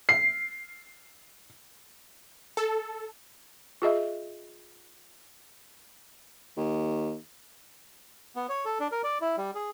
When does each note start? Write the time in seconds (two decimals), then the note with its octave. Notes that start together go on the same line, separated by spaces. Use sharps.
0.09 C7
2.57 A4
3.82 F4 G#4 D#5 E5
6.57 D#2
8.36 B3
8.49 C#5
8.65 A4
8.80 D4
8.92 A#4
9.04 D5
9.21 E4
9.37 G3
9.55 G#4